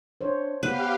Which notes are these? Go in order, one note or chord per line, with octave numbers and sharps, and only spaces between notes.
D4 C5 C#5
B3 G4 B4 F5